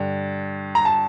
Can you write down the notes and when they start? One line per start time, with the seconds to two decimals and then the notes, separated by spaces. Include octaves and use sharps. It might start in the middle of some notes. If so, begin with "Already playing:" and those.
Already playing: G2 D3
0.75 A#5
0.85 A5